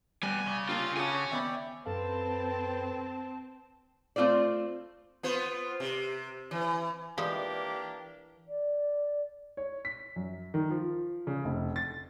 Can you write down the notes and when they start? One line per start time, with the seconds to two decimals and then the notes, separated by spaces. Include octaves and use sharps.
0.23 G3 B3 G4 G#5
0.47 C#3 D5
0.69 A#3 D4 F4 G4 C6 E6
0.97 F#4 G#4 C#5 F5 G#5 A5 D6
1.31 D#2 B3 D5 E5 G5 B5
1.86 F#2 C4 A4 B4 F5 A5
4.16 A3 C4 F4 C5 D5
5.23 B3 F4 C5
5.80 C3
6.51 E3
7.18 E3 F3 G3 G#3 A#3 D4 G4
8.48 D5
9.57 C#5
9.85 B6
10.16 F#2
10.54 D#3
10.70 F3
11.27 C#3
11.45 F1
11.76 A6